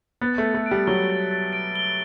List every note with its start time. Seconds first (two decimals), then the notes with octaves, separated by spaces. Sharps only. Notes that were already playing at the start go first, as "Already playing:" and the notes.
0.21 B3 A6
0.38 A3
0.43 A6
0.54 A3
0.66 D7
0.71 G3
0.87 F#3 G7
1.10 A6
1.31 A6
1.53 D7
1.76 G7